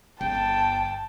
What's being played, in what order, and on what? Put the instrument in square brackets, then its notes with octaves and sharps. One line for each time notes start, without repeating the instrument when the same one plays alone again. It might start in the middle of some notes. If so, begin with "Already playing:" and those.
[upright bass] G1 [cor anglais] G5 [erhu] A5